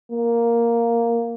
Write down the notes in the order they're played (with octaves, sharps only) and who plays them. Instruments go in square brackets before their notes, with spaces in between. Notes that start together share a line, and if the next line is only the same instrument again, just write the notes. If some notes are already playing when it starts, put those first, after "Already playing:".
[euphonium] A#3